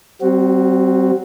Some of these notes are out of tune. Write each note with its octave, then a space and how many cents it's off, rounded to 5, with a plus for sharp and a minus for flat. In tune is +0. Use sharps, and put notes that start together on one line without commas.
G3 -40 C4 +0 F#4 +0